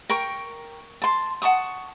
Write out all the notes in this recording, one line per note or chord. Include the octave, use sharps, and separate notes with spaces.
A#4 G5 C#6
A5 C6
F#5 A5 C#6 D#6